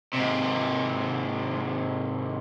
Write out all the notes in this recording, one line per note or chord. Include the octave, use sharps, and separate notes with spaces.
G#2 C3